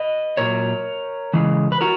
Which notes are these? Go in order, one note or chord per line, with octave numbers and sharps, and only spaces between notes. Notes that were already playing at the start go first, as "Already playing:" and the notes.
Already playing: B4 D#5
A#2 F#3 A#4 C#5
C#3 E3 G#3
B4
F#4 A#4